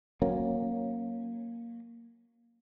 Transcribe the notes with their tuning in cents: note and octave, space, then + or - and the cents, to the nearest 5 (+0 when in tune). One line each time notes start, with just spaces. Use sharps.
F#3 -5 A#3 +0 C#4 -15